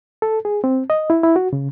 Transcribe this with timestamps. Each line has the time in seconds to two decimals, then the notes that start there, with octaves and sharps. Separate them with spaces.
0.22 A4
0.45 G#4
0.64 C4
0.90 D#5
1.10 E4
1.24 E4
1.36 F#4
1.53 C#3